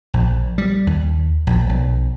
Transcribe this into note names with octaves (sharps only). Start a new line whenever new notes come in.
A#1
G3
D#2
A#1
B1